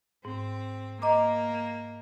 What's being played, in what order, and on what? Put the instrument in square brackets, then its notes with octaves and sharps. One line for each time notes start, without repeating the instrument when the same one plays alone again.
[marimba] G#2 [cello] C4
[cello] A#3 [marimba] D#5 A#5 D6